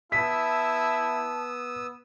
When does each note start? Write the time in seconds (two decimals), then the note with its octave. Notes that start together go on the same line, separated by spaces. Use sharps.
0.12 B3 E4 A5 D#6 E6 B6